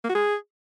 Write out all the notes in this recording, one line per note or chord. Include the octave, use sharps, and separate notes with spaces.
A#3
F#4
G#4